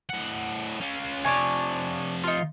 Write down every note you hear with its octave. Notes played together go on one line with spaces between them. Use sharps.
A2 F#5
C#4 F4
C3 F3 D4 C#5 G#5
D#4 F4